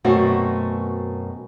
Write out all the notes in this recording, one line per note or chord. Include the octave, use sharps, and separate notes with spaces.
F#2 B2 A3 C4 F#4